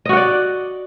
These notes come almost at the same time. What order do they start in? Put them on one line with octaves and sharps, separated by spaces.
D#5 F#4 F#5 D5